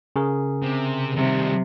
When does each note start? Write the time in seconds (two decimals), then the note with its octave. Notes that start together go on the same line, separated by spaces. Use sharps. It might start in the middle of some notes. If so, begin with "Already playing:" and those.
0.16 C#3 G#4 A#4
0.63 C3
1.15 C3 D#3 G3